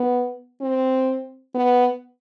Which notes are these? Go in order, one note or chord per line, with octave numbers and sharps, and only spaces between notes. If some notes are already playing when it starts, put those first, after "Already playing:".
Already playing: B3
C4
B3